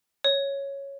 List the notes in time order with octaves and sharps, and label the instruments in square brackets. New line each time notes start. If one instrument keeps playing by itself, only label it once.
[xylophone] C#5